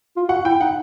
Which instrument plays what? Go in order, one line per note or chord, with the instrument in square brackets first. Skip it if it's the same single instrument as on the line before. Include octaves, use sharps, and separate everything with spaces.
[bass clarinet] F4
[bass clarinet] F#4 [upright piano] F#5
[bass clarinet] E4 [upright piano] G5
[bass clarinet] D#4 [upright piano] F#5